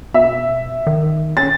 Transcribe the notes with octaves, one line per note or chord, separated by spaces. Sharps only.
B2 E5
D#3
C#4 A6